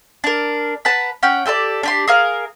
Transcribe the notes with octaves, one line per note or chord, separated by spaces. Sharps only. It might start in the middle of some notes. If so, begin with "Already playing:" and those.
D4 A#4
B4 F#5 A5 A#5
C#4 F#5 G5
G4 A4 B4 D5
D4 G4 C6
G#4 A#4 F5